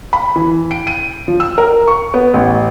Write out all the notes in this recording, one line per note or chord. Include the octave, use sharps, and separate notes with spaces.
B5
E3
D7
D#7
F3
E6
A#4
C#6
B3
A1